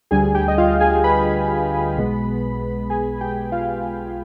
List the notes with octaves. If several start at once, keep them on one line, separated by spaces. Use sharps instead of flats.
D2 D3 G3 G#4 G#5
G4 G5
D#5
F4 F5
G#4 G#5
B4 B5
B1 B2 G#3 B3
G#4 G#5
G4 G5
F4 F5